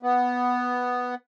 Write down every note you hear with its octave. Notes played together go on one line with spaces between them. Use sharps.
B3